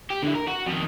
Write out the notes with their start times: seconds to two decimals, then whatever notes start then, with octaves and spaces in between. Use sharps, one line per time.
0.10 G4
0.22 D3 E4
0.35 A#4
0.47 F#4
0.66 F2 D#3